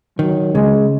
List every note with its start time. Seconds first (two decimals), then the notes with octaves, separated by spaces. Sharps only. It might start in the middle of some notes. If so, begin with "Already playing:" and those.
0.19 D#3 F#3
0.54 C#3 G#3